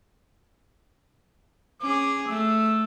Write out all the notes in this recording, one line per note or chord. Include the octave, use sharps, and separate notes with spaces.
C#4 G#4 D6
A3 E6